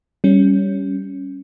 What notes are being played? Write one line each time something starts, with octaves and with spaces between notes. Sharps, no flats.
G3 C#4